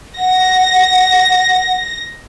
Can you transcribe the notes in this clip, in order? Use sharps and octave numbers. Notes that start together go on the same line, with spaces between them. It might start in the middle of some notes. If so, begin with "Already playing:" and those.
F#5 A#6